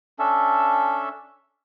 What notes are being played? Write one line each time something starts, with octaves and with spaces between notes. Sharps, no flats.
C#4 D4 A4 E5